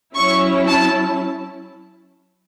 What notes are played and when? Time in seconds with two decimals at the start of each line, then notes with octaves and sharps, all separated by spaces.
0.15 F#3 C#4 E4 C#6
0.67 A5